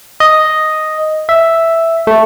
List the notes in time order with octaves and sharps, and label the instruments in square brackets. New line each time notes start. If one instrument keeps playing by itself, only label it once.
[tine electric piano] D#5
E5
A3